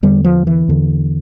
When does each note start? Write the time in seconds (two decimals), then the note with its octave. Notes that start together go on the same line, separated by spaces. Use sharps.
0.03 E2 D3 G3
0.25 F3
0.47 E3
0.68 E2 D3